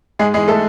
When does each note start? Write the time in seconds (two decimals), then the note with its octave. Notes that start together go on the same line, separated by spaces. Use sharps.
0.19 G#2 G#3 G#4
0.34 E3 G#3 G#4
0.48 A3 A4